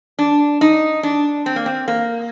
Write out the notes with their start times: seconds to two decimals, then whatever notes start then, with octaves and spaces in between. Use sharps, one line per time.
0.19 D4
0.61 D#4
1.03 D4
1.46 C4
1.56 A#3
1.66 C4
1.88 A#3